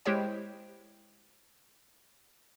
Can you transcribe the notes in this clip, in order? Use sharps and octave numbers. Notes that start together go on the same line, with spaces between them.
G#3 E4 G4 C5 C#5 G5